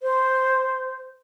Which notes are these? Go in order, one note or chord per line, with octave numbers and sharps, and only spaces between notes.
C5